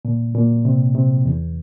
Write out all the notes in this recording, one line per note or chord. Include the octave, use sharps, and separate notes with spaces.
A#2
A#2
C3
C3
E2